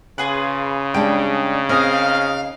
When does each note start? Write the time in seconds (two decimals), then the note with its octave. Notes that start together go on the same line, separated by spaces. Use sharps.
0.18 C#3 F4 G#4 B4
0.94 G3 G#3 D4 G5
1.69 C4 D#4 G#4 A#4 D#5 F5